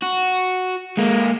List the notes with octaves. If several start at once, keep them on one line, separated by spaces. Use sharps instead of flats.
F#4
G#3 A#3